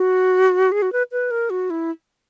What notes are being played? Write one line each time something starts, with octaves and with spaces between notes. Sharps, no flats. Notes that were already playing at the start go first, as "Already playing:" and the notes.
Already playing: F#4
G#4
F#4
B4
B4
A#4
F#4
E4